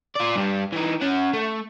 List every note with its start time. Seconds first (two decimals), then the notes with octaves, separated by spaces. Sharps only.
0.16 F4 D5
0.36 G2 G3
0.72 E3 D#4
1.01 C#4 F#5
1.34 A3